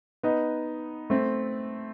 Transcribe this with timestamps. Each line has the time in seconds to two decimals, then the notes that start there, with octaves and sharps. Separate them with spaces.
0.23 B3 D#4
1.10 A3 C4